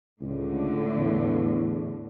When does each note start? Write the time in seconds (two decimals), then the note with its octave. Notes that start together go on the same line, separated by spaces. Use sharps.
0.21 C#2 A2 D3
0.95 E2